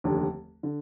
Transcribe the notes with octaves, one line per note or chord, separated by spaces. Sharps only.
F1 D#2 D3
D3